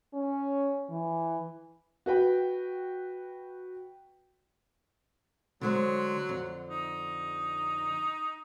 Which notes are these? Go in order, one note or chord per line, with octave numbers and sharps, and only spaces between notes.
C#4
E3
F#4 B4 G5
D3 F#3 G#3 C5
F2 D3
D#4